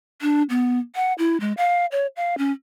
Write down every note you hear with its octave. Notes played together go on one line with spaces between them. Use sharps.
D4
B3
F#5
E4
G#3
F5
C#5
F5
C#4